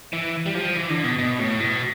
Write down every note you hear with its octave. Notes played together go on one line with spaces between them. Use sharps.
E3
G3
F3
E3
D3
B2
B2
A2
B2